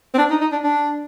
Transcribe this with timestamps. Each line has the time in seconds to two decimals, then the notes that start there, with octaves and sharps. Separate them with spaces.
0.14 C4
0.18 D4
0.30 D#4
0.41 D#4
0.52 D4
0.64 D4